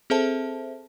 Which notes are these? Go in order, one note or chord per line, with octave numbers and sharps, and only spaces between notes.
C4 G#4 A4 C5 E5 A5